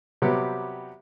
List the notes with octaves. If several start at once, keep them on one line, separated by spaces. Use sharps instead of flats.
C3 F#3 G3 B3 G4